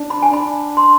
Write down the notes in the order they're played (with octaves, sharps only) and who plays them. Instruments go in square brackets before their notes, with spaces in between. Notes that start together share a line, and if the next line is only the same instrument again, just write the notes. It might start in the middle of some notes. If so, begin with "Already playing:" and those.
Already playing: [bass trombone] D4
[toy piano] B5
G#5
[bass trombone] D4 [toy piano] B5
[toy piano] C6